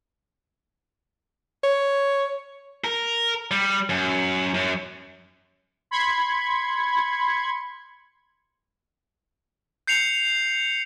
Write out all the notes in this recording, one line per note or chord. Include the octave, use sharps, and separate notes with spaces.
C#5
A#4
G3
F#2
F#2
B5 C6 G#6 C#7
G6 C7 C#7 F7